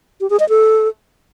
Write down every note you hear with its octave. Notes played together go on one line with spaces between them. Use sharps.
G4
G#4
D#5
A4